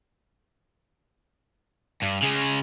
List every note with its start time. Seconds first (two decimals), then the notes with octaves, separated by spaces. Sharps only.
2.03 G2
2.23 C#3 G#3